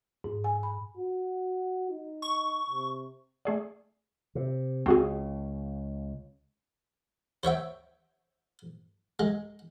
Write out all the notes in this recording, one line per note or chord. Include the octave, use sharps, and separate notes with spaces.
G#2
G#5
B5
F#4
D#4
C#6
C3
A3 G#4 D5
C3
C#2 C#3 C4 F#4 G#4
C5 C#5 E5 G5
G#3